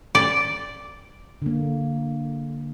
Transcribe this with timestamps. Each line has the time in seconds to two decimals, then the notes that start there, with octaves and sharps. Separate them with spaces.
0.15 D5
1.42 D3 A#3